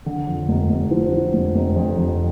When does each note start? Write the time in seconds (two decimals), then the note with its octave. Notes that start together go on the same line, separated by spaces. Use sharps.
0.06 D3
0.27 F2
0.48 F1
0.70 F1
0.91 F3
1.12 F3
1.33 F1
1.55 F1
1.76 F2
1.97 F2